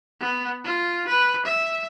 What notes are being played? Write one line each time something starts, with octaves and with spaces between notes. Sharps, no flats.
B3
F4
B4
E5